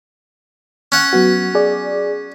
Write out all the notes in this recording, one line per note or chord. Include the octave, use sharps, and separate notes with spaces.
C#4 F#5
F#3 B3 F#4
G#4 D5